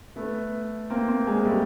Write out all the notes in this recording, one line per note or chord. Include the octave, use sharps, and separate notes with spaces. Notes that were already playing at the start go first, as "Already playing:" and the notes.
A3 B3
A#3 C4
A#3 C4
G#3 A#3
G3 A3